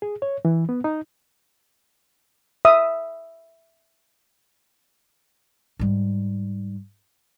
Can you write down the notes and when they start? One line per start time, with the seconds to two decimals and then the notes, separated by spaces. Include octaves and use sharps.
0.02 G#4
0.22 C#5
0.45 E3
0.69 B3
0.84 D#4
2.65 E5 D#6
5.79 G#2 G3